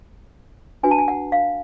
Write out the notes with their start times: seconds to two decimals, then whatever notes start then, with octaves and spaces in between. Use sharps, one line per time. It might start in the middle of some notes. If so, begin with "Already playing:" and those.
0.83 D4 F#4 B4 G#5
0.91 A5
0.98 G#5
1.08 F#5
1.32 F5